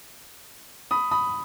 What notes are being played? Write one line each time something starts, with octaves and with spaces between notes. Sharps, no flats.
B5 D#6
B5 D#6